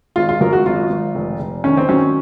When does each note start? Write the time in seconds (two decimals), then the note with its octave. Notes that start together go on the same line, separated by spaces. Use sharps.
0.16 G#1 F4
0.29 F4
0.41 F#2 A#4
0.53 F#4
0.66 G#1 F4
0.90 G#1
1.15 F1
1.40 F1
1.64 D#3 C#4
1.77 C4
1.88 F#3 C#4